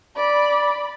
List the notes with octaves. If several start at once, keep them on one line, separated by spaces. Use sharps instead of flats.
D5 B5